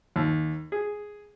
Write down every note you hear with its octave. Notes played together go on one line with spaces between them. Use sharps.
D#2
G#4